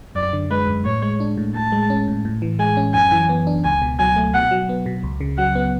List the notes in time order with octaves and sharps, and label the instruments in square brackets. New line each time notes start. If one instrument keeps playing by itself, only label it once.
[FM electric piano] F#2 [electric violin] D5
[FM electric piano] D3
[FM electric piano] G#3 [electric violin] B4
[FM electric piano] F#2
[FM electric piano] A2 [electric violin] C#5
[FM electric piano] G#3
D4
A2
[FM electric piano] A2 [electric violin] A5
[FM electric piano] G#3
C#4
A2
A2
E3
[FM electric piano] G#3 [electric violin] G#5
[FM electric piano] C#4
[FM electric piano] F#2 [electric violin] G#5
[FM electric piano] E3
B3
D4
[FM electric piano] C#2 [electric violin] G#5
[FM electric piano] B2
[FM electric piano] F#3 [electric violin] G#5
[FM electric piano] A3
[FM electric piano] B2 [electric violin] F#5
[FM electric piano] F#3
B3
B2
C#2
C#3
[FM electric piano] F#3 [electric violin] F#5
[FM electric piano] B3